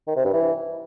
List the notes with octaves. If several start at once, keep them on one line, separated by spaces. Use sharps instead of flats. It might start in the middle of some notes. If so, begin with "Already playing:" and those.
D#3
C3
G2
E3